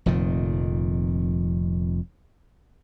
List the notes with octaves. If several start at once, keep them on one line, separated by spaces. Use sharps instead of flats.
F1 F2 A#2 D#3